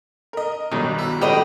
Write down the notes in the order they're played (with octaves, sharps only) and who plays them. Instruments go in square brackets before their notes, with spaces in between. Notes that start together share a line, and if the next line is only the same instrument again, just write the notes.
[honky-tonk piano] A#4 D#5
[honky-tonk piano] B1 G2 [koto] D#3 D#4
[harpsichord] E4
[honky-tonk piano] F2 [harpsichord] A2 [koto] G3 [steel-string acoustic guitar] G4 B4 D#5